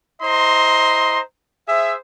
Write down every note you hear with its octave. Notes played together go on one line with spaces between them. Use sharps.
E4 C5 D#5 A#5 C6
G#4 C5 E5